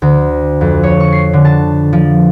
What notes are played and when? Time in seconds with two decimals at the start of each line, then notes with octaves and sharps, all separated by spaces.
0.02 D2
0.61 F2
0.83 C#5
1.00 C#6
1.13 C7
1.33 D3
1.45 A5
1.93 F3